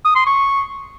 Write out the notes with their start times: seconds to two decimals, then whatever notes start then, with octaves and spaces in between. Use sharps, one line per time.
0.04 D#6
0.15 C6
0.26 C#6